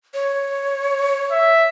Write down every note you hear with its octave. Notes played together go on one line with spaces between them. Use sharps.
C#5
E5